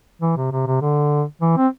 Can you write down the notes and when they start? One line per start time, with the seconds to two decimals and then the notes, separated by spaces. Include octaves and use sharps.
0.22 E3
0.37 C3
0.52 C3
0.67 C3
0.81 D3
1.42 E3
1.57 C4